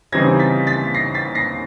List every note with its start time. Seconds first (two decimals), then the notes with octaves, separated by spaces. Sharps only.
0.12 C#3 E3 G3 C4 D#4 G#6 A#6
0.39 A6 B6
0.67 A6 B6
0.94 A#6 C7
1.14 A6 B6
1.35 A#6 C7